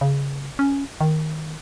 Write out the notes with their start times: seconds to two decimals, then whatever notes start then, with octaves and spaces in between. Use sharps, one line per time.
0.01 C#3
0.59 C#4
1.01 D#3